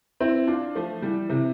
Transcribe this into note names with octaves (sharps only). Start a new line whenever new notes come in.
C4 E4
D4 F4
F3 A3
E3 G3
C3 E3